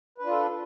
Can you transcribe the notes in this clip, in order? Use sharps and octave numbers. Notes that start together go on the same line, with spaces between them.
D4 F4 A4 B4